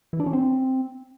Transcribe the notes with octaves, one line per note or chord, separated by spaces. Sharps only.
E3
D4
C#4
C4